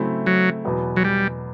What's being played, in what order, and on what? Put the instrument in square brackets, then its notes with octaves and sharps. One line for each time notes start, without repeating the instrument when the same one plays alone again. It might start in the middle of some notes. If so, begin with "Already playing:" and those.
Already playing: [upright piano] C#3 F#3 A3 C4 E4
[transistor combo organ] F#3
[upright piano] E2 B2 F#3 B3
[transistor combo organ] F#3
G3